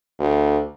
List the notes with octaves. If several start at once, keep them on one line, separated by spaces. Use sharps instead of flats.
D2